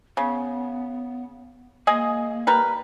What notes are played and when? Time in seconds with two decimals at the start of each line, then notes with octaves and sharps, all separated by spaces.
0.17 C#3 B3
1.87 G#3 A#3 G#4 D#5
2.47 G3 A#4 B4